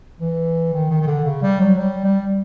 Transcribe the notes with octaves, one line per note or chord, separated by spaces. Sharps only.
E3
D#3
D#3
D#3
D3
C#3
G3
F#3
G3
G3